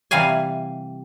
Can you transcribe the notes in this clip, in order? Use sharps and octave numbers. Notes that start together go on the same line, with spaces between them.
C3 E3 G3 F5 G#5